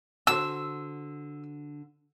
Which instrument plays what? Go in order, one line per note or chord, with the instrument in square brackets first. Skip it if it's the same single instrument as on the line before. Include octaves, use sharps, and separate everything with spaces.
[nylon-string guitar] D3 F#4 C5 [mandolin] E6